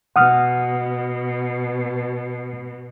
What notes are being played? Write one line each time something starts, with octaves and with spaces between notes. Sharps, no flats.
B2 F#5 D#6 F6